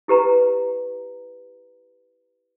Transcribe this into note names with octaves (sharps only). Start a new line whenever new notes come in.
E4 G4 B4 A#5